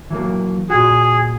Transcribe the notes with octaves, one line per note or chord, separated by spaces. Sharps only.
E3 F#3 A#3
A#2 F#4 G#4